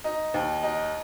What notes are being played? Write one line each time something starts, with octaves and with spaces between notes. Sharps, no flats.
D#4
D#2
D#4